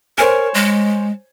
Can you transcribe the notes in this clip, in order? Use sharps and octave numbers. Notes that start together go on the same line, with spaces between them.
A#4 C5 C#5 G#5
G#3